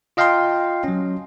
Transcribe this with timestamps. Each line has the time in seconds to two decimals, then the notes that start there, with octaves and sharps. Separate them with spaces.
0.17 F4 D#5 F5 G5 A5 C6
0.84 F#3 C#4